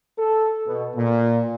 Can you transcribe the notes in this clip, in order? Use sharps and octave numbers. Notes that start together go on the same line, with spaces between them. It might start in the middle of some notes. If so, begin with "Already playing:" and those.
A4
B2
A#2